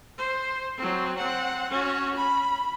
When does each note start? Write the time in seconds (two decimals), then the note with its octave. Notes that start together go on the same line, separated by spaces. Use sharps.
0.18 C5
0.77 F#3 C4
1.18 C4 F#5
1.70 C#4 F#4
2.15 B5